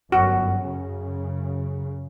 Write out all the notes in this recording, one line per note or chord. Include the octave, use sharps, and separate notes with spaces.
G1 F#2 F#4
F#2 C#3